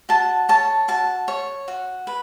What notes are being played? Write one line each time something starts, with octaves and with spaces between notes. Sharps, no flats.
F#4 A5
C#5 A5
F#4 A5
C#5
F#4
B4